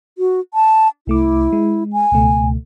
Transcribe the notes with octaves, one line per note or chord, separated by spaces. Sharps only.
F#4
A5
C2 A3 E4 D6
G#3
G#5
C#2 B2 A3